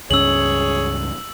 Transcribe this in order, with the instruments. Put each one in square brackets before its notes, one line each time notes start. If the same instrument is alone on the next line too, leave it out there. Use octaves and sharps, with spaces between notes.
[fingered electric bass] C#2 G2 C#4 [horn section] G#4 C#5 [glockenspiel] E6 F#7